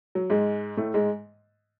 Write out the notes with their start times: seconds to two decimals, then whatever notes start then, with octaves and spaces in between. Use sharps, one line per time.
0.15 F#3
0.30 G#2 G#3
0.77 A2 A3
0.94 G#2 G#3